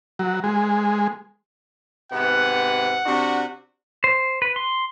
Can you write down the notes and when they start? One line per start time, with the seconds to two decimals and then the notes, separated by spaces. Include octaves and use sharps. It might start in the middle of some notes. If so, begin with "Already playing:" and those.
0.19 F#3
0.44 G#3
2.12 G#2 C3 B3 F#5
3.05 C3 D4 F#4
4.04 C5
4.42 B4
4.56 C6